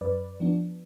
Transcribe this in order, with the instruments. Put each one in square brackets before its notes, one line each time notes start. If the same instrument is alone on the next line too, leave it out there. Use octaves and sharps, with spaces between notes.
[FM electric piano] F#2 B4 D5
F3 B3 D4